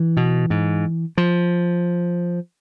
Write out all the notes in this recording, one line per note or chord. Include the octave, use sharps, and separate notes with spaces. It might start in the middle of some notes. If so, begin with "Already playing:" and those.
Already playing: E3
B2
G#2
F3